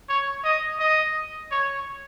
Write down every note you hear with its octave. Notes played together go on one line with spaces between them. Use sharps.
C#5
D#5
D#5
C#5